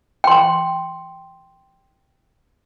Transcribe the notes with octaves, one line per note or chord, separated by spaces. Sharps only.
G5 C6